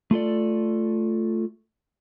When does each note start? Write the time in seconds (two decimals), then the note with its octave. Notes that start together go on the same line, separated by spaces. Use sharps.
0.11 A3 F4 A4 D5